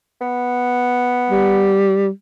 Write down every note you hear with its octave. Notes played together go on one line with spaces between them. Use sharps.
B3
G3